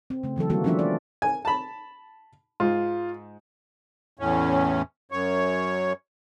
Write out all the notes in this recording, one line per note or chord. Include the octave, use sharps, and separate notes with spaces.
C4
C#3 A3
C#3 E3 F#3 A4
D#3 G3 A#3 F#4 A4
F3 A3 C#4 D4 F4 E5
D5
G#5
A5 B5
G#2 F4
E2 A2 C#4
F#2 C#5